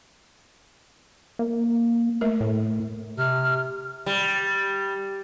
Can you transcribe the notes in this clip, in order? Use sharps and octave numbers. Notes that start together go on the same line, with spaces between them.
A#3
A3 A#4
A2
C3 F6
G3